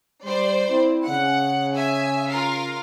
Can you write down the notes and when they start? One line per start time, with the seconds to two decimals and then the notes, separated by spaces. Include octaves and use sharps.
0.25 G3 C5 D5
0.69 C4 E4
1.07 C#3 F#5
1.74 E5 G#5
2.30 F4 A#4 F5